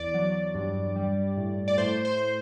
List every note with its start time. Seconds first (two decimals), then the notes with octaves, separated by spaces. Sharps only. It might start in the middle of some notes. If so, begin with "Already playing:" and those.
Already playing: E2 D5
0.14 F#3
0.55 G2
0.96 G3
1.37 A2
1.68 D5
1.78 A2 C5
2.05 C5